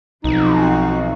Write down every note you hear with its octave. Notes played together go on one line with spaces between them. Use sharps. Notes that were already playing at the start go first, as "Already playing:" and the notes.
B1 F3 C4 D#4 F#4